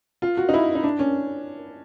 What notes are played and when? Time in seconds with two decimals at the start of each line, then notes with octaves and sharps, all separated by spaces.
0.22 F4
0.37 F#4
0.49 D#4
0.54 E4
0.75 D#4
0.84 D4
0.99 C#4